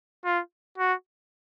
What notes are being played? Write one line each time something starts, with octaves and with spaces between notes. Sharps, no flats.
F4
F#4